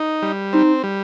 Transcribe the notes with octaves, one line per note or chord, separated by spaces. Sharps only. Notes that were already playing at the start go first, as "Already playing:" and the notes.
Already playing: D#4
G3
C4 D#4
G3